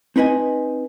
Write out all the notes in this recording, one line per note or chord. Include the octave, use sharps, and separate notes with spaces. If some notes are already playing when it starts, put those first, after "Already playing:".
C4 D#4 B4 D#5 G#5